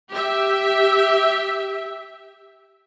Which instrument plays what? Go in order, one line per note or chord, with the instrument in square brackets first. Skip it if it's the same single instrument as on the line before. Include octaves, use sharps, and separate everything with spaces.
[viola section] G4 E5